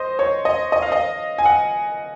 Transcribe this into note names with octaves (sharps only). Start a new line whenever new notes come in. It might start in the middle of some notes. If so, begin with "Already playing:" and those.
Already playing: C5 D#5
C#5
D#5
D#5
F5
D#5
G#5
F#5